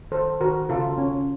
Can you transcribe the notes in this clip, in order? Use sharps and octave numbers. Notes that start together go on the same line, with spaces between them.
D#3 A4 C5
D#3 F#4 A#4
C#3 F4 A4
C#3 C#4